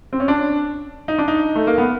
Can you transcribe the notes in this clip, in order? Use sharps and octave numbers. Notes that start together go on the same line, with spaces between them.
C4
C#4
D4
D#4
D4
D#4
A3
A#3
B3